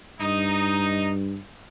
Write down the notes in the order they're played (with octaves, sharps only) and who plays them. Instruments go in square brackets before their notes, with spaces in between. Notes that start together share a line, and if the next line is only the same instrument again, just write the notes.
[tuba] G2 [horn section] D#4